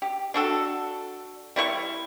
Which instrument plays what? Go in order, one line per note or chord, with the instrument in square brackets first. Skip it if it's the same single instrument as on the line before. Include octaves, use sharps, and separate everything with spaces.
[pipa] G4
D4 F#4 A4
G3 E4 C5 C#6